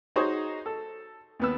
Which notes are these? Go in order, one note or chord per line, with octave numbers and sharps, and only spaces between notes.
D#4 F#4 G#4 C5 C#5
A4
D#2 B3 E6